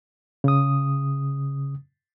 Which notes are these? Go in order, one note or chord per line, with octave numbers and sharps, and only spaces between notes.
C#3 D#6